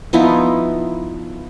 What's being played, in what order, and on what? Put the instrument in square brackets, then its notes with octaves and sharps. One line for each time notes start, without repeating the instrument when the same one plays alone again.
[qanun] F3 B3 D#4 E4